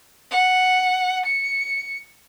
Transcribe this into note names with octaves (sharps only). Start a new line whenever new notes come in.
F#5
C#7